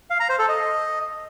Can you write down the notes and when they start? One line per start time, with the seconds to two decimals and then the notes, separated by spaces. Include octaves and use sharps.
0.10 F5
0.20 A#5
0.29 C5
0.39 A4
0.49 D#5